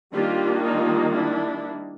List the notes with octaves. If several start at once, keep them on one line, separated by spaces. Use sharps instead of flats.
D#3 G3 A#3 D4 F4 G4
D#4 F4
D4 E4